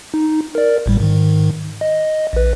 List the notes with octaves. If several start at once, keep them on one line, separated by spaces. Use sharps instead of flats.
D#4
A#4 D5
G#1 A2 G3
G#2 D#3
D#5
A#1 B4